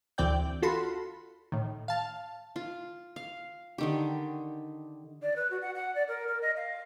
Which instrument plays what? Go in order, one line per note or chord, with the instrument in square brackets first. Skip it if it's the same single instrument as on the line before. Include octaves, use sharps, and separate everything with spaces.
[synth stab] D2 E3 C4 D5 G5 G6
F4 F#4 A4 B5 C6
A2 D#3
F5 A5
[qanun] F4
F5
D3 D#3 G4
[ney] D5
B4
F#4
F#5
F#5
D5
A#4
A#4
D#5
F5